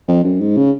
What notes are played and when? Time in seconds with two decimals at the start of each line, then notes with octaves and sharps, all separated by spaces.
0.08 F2
0.24 F#2
0.41 G#2
0.57 C#3